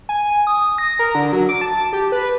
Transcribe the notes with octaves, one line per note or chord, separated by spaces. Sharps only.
G#5
D#6
A#6
A#4
D3
F#3
D6
A5
G4
B4